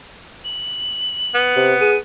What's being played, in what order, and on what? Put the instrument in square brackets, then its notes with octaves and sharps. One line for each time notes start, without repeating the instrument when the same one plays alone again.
[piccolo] F#7
[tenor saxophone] B3
[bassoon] C3
[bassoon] G#4 [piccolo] D#7